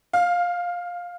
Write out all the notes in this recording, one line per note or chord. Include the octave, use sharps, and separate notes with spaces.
F5